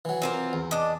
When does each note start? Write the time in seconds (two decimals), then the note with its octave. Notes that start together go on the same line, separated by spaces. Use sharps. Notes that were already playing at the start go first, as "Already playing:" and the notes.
0.05 E3 F#3
0.22 C4 F4 A#4
0.53 E2
0.71 D4 D#5